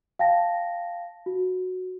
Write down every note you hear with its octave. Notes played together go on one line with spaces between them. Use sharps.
F5 G5 A5 A#6
F#4